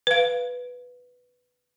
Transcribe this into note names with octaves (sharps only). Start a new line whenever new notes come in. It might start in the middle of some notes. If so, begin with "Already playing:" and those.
B4 F5